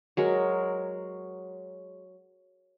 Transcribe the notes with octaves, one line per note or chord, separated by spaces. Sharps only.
F#3 G#3 A#4